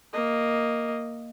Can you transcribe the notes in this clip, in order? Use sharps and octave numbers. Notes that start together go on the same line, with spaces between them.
A#3 D#5